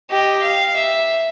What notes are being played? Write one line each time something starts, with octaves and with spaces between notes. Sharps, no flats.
G4 D#5
F5
E5